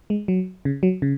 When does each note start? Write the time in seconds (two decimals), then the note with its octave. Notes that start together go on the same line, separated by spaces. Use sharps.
0.10 G#3
0.28 F#3
0.65 C#3
0.83 F#3
1.02 C#3